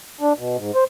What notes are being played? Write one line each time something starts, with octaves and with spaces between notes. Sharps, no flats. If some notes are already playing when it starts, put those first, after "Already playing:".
D4
B2
G#2
C5